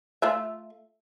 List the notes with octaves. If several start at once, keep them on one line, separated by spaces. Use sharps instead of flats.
A3 F4 E5